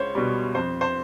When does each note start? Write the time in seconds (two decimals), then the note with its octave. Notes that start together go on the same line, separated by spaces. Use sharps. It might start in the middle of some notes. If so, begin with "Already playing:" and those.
Already playing: C#2 C5 C#5
0.15 B2 G3
0.55 F2 C5
0.81 C5